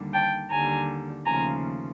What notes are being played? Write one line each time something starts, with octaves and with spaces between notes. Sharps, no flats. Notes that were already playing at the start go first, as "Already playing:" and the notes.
Already playing: D#2 D3 G3
G5 A5
D#2 D3 G3 G#5 A#5
D#2 C#3 F3 A3 G#5 A#5